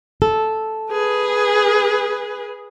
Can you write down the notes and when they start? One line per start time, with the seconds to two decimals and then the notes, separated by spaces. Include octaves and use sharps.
0.22 A4
0.91 G#4 B4